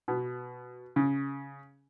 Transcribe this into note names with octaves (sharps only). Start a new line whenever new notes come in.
B2
C#3